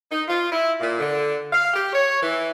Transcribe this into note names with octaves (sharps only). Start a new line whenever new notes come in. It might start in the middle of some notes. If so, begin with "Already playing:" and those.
D#4
F4
E4
A#2
D3
F5
G4
C#5
E3